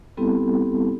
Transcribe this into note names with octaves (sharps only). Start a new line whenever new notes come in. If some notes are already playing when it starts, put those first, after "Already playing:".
G3 B3 C4 E4 G4 A4